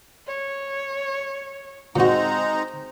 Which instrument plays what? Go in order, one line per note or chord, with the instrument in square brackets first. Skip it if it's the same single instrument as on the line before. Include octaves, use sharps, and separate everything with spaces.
[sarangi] C#5
[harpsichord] A#2 F#4 [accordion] G#3 D#4 A#5 [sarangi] C4